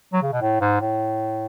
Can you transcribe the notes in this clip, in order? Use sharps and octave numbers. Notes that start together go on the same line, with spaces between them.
F#3
C#3
B2
A2
G#2
A2